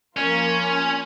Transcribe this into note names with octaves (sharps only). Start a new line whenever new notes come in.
F3 A#3 C#4 F4 A#4